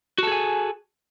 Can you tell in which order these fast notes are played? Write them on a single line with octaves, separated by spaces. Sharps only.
F#4 A4 G#4 G#5